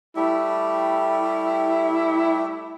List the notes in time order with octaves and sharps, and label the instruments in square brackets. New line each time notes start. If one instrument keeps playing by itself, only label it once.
[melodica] G3 A3 G4 [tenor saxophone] E4